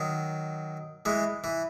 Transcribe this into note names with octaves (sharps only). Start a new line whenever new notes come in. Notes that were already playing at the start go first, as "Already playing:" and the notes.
Already playing: D#3 F#3
E3 G#3
E3